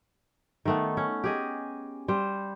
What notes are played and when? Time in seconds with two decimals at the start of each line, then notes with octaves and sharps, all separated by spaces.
0.65 D#3 A3 B3
0.97 C#4
1.24 G4 G#4 D#5
2.08 G3 C5